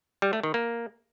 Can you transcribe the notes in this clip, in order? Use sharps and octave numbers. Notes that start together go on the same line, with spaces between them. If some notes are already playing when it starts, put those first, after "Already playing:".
G3
A3
D#3
A#3